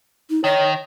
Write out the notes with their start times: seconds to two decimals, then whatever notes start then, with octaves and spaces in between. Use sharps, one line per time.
0.30 D#4
0.44 D#3 C#5